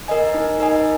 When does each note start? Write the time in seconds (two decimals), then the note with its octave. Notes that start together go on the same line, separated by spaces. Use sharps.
0.08 A#4 D#5 G#5
0.34 D#4
0.60 A#4 D#5 G#5